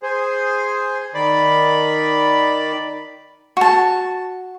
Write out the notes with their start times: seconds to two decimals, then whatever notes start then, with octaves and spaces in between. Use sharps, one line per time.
0.03 G#4 C5
1.14 D#3 D5 B5
3.57 F#4 A5